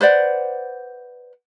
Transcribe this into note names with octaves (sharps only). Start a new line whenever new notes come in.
B4 C5 D5 F#5